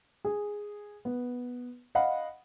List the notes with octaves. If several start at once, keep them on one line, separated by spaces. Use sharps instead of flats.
G#4
B3
D#5 F5 F#5 B5